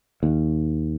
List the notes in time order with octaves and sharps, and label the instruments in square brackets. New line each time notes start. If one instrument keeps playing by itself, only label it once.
[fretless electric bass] D#2